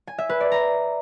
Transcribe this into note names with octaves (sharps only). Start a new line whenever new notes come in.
G#5
E5
B4
D5
A#5